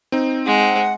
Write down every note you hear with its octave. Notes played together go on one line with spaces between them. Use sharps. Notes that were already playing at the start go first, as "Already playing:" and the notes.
C4 D#4
G#3 F#5